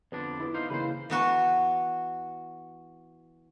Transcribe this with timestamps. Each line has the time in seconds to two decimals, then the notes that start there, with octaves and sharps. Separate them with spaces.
0.12 F2 D3 B3 D4
0.40 B3 E4
0.54 D#4 C5 F5
0.70 C#3 E3 A#3 B4 C5
1.10 E3 B3 F#4